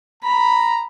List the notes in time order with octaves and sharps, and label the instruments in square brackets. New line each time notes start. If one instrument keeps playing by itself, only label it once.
[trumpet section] A#5 [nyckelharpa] B5